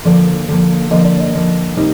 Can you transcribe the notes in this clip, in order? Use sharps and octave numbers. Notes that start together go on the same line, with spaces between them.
D3 F3 A#3 D5
D3 F3 A#3
D3 F3 A#3 D#5
D5
D#5
D3 F3 A#3
C3 G3 A#3 D#4